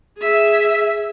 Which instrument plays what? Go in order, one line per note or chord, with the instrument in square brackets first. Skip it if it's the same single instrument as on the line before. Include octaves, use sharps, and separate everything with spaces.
[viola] G#4 E5